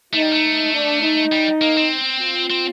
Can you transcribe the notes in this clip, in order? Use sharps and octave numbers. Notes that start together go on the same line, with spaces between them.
A3 D#4
G3
A3
D4
D#4
G3
A#3
C4
F4
C4